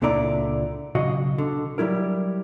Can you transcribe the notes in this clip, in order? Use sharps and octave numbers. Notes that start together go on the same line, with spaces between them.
C#2 A#2 D3 E4 D5 A#5
B1 C#3 F#4 D#5 F5
D3
F#3 G3 E4 A#4